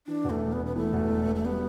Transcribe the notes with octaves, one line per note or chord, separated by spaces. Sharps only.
E3 D4
E2
A3
E1
B3
E1
B3
E3 A3
E2
E1
E1
A3
G3 B3